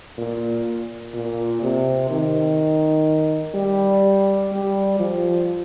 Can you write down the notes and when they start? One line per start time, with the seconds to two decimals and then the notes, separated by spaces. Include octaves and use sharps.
0.18 A#2
1.14 A#2
1.62 C3
2.10 D#3
3.55 G3
4.52 G3
4.99 F3